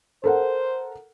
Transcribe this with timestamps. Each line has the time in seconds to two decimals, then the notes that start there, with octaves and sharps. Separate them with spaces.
0.24 A4 A#4 C5 F#5